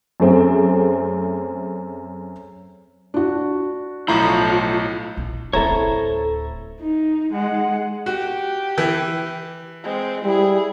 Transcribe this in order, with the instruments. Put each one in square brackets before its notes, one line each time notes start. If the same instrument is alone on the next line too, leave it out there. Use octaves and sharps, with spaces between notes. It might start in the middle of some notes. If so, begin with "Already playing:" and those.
[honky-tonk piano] F#2 A3 C4 G#4
[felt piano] D4 F#4
[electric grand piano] B1 A2 A#5 [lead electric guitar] F3 [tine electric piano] E4
[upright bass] A#1
[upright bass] D1 C#4 [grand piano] E4 A#5 [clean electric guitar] A4 C5 C#5
[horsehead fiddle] D#4
G#3 F#5
[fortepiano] F#4 [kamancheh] G4
[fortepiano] E3
[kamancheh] G#3 C4
[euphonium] G3 [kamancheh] E4 G#4